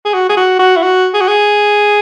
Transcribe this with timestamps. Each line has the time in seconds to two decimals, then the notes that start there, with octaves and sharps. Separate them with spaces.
0.05 G#4
0.14 F#4
0.29 G#4
0.37 F#4
0.59 F#4
0.76 E4
0.83 F#4
1.14 G#4
1.21 F#4
1.27 G#4